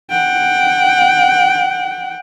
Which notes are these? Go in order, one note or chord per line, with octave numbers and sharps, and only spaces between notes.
F#5 G5